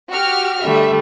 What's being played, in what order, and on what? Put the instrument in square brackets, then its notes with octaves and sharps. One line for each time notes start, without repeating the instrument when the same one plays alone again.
[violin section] F#4 G4 F6
[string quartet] D3 G3 A3 [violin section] E5